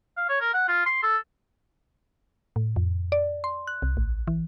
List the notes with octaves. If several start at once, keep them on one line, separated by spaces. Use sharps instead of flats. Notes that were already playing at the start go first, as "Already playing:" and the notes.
F5
C#5
A#4
F#5
F4
C6
A4
A2
F2
D5
C6
F#6
C2
A1
E3